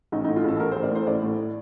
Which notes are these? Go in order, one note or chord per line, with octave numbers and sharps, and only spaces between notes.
A1 D#4
A2 D#4
F4
A1 A4
A2 A#4
A1 C5
D5
A2 C5
A1 D5
A2